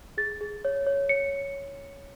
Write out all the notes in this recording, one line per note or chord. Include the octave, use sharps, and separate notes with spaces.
G#4 A6
G#4
C#5
C#5
C#5 C#7